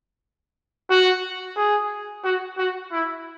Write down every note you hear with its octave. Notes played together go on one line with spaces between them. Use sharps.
F#4
G#4
F#4
F#4
E4